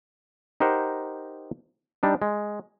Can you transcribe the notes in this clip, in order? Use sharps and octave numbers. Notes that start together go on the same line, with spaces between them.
D#4 G4 A#4 C5 F#5
G3 D4 D#4
G#3